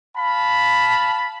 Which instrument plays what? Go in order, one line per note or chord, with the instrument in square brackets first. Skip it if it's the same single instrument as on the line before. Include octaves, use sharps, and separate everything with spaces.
[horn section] F5 A5 B5